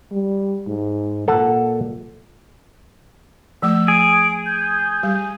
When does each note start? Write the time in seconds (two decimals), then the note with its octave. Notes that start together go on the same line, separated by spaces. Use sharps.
0.12 G3
0.67 G#2
1.28 A#2 A4 F#5 A5
3.62 F3 A3 D6 E6
3.88 G#4 D7
4.46 G6
5.03 G3 G4